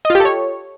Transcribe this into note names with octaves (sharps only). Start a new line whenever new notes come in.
D#5
F4
G4
A4
C#5